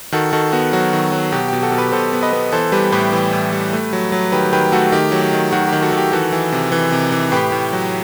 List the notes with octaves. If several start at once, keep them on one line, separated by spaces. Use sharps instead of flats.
D#3 F#4 A4
D#3 F#4 A4
B3 F#4
F#3 F#4
D#3
F#3
B2 G4
B2 G4
F#4 A4
B2
G4 B4
B2 A4 C5
B3
B4 D#5
B3
E3 A4 C5
G3 G4 B4
A2 G4 B4
E3
A2
G3
A3
F#3
F#3
D#3 G4 B4
D#3 G4 B4
A3 F#4 A4
D#3 G4
F#3
G4
D#3
D#3 F#4
D#3 G4
F#4 A4
D#3 A4
G4
E3 F#4 A4
E3
C3
E3
C3
E3
A2 G4 B4
A2
F#3